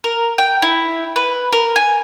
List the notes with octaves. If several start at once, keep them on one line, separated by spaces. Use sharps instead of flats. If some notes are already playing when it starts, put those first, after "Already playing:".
A#4
G5
E4
B4
A#4
G#5